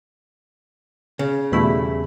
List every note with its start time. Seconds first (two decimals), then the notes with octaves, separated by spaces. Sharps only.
1.19 C#3
1.52 E2 B2 G3 A3 E4 B5